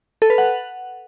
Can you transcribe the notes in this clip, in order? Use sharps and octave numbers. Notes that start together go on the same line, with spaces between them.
A4
B4
F#5